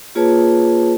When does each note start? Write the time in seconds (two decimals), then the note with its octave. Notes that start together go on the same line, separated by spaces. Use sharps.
0.15 A#3 F4 G#4 B4 C#5 A5